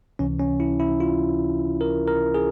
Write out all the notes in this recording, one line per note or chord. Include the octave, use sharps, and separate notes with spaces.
C#2 C3 E3 C#4
C#4
E4
E4
F4
A#4
A#4
G#4